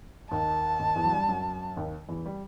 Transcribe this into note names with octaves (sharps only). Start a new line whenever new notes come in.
D#2 D#3 A5
D#2 D#3
E2 E3
F#3
G2 G3
F#2 F#3
D#2 D#3
E2 E3
G3